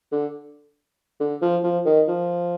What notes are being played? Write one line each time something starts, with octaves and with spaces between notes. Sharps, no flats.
D3
D3
F3
F3
D#3
F3